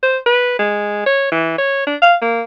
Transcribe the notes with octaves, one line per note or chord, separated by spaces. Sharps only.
C5
B4
G#3
C#5
E3
C#5
D4
F5
A#3